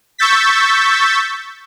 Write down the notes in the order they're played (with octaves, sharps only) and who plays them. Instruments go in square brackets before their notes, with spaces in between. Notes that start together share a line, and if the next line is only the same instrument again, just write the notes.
[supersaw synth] C#6 E6 G6 A6 B6